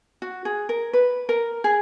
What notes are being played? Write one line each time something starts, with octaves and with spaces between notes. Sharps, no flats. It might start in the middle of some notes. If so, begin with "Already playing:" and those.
F#4
G#4
A#4
B4
A#4
G#4